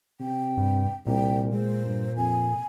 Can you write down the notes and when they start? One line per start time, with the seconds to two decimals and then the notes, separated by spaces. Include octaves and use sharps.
0.20 C3 G5
0.57 G2
1.07 C2 A#2 G5
1.53 G#3 C5
1.85 G2
2.17 F2 G#5